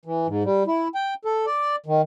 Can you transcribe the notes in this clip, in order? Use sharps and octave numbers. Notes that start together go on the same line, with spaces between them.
E3
G#2
G3
E4
G5
A4
D5
D#3